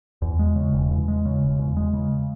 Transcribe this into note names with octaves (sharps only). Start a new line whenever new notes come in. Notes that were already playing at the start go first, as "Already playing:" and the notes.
E2
G#3
C#3
E1
E2
G#3
C#3
E1
E2
G#3
C#3